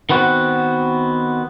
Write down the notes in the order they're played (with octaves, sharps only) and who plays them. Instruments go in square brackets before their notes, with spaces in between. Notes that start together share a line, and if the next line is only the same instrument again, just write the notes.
[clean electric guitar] D#3 B3 C4 F#4